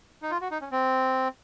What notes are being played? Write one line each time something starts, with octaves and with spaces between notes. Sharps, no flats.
D#4
F4
F#4
D#4
C#4
C4